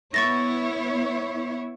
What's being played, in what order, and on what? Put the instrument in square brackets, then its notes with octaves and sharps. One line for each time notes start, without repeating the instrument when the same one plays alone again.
[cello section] B3 E4 C#5 [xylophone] C#6 A6 A#6